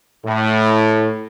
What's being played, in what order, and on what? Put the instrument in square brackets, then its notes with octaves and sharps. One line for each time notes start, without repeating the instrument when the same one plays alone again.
[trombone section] A2